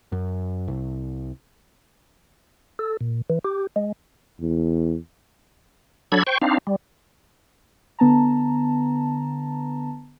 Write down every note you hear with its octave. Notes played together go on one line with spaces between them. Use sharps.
F#2
C2
A4
A#2
E3
G4
G#3
E2
F#3 D4 A4 B5 G#6
C5 G5 C#6
C4 D4 D#4 F5
G3
D3 B3 A5 A#5